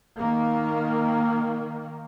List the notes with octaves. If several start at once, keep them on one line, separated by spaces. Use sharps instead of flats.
D#3 A#3